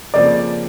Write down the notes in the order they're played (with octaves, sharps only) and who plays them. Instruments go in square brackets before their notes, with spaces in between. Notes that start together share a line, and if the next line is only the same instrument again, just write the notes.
[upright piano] F2 C#3 F3 A#3 [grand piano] D5